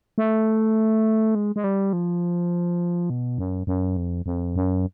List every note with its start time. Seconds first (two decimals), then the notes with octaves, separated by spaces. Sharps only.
0.18 A3
1.35 G#3
1.56 G#3
1.64 G3
1.93 F3
3.10 B2
3.38 F#2
3.67 F#2
3.97 F2
4.26 F2
4.56 F#2